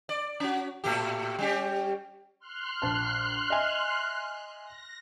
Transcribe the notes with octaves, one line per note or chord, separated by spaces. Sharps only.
D5
C#4 F#4
A2 A3 G4
G3 C#4 G4
C6 F6 F#6
A#1 A5
D#5 E5 G#5
A#6